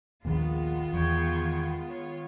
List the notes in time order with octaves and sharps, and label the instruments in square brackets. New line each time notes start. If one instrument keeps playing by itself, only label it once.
[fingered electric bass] A#1 D#2 A#2 [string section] D#3 G#3 B3 [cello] F4
[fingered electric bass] E2 [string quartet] G5 C#6 G#6
[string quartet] C#5